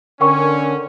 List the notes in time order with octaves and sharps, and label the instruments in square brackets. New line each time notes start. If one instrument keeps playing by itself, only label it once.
[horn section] D3 C#4 [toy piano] A#4 G5 C#6